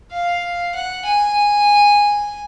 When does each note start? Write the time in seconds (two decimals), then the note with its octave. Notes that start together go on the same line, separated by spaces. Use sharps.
0.12 F5
0.75 F#5
1.06 G#5